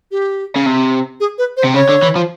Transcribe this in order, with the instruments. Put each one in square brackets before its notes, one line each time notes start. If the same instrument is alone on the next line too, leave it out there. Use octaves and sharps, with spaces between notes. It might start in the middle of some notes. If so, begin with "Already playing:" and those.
[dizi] G4
[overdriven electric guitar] C#3
C3
[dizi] G#4
B4
C5
[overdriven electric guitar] C3
[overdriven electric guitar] C#3 [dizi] C#5
[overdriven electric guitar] D3
E3
F3